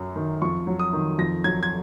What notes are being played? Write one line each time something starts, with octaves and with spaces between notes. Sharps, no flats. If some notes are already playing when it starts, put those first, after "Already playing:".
Already playing: F#2 F#3
D#3
F2 C#6
F#3
D#6
D#3
F2 A#6
F#3 G#6
G#6